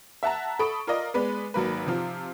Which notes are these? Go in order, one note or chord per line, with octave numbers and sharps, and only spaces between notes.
E5 F#5 A5 A#5
A4 B5 C#6 D#6 D7
F4 A#4 D5 D#5
G#3 B3 B4 D5
G#1 F#3 A#3 B4
C3 F3 F4